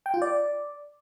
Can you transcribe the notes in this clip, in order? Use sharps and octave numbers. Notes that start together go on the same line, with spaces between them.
G5
F4
D5